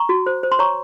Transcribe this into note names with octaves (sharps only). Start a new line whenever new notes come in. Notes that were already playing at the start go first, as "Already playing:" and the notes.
Already playing: A#5 C#6
F#4
C5
C5
C6
C#5 A#5 C#6